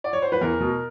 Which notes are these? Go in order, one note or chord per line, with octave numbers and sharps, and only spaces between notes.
D5
C#5
C5
B4
E2 A#4
B2